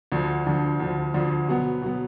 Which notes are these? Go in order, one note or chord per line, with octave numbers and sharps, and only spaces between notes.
D2 D3 F3
D2 D3 F3
D2 D3 F3
D2 D3 F3
B2 F#3 B3
B2 F#3 B3